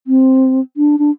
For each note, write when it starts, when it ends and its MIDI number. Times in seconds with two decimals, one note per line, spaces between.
0.07 0.61 60
0.77 0.99 62
0.99 1.11 62